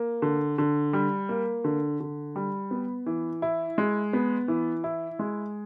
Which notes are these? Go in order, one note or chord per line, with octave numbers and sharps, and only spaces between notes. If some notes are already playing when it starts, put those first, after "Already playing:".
Already playing: A#3
D3
D3
G3
A#3
D3
D3
G3
B3
E3
E4
G#3
B3
E3
E4
G#3